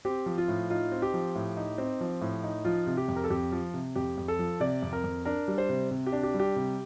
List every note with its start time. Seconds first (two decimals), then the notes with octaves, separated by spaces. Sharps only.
0.05 C4 G4
0.26 F3
0.38 F4
0.48 A2
0.70 D#4 F4
0.92 C4
1.02 G4
1.14 F3
1.35 A2
1.57 D#4
1.78 C4
2.01 F3
2.21 A2
2.44 D#4
2.65 F3 F4
2.87 C3
2.97 G4
3.08 F2
3.16 A#4
3.24 A4
3.30 F2 G4
3.52 F3
3.74 C3
3.96 F2 G4
4.18 F2
4.28 A4
4.39 F3
4.60 C3 D5
4.82 F2
4.93 A#4
5.04 F2
5.25 D4 A#4
5.48 G3
5.58 C5
5.69 C3
5.91 C3
6.06 G4
6.12 D4
6.23 G4
6.34 G3
6.40 G4
6.56 C3